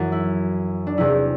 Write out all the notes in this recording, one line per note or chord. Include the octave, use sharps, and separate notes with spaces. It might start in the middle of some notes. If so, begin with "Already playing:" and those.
Already playing: F#2 E3 F#4
E4
D4
E2 C3 E3 E4